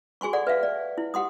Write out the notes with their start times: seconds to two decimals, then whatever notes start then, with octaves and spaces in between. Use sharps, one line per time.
0.21 F#4 G#4 G#5 C6 C#6
0.33 A4 D5 F#5
0.47 B4 E5 F5
0.63 D5
0.98 E4
1.14 G4 F#5 C6 D#6